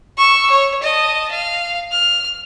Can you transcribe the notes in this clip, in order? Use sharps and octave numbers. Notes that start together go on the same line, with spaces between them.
C#6 E6
C#5
D#5 A5
F5
F6